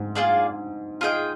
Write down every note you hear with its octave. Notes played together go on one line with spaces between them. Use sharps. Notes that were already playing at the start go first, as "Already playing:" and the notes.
Already playing: G#2
A#3 F4 G#4 D5
F4 G#4 D#5 G5